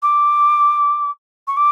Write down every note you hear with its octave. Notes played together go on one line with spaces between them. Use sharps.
D6
C#6
D6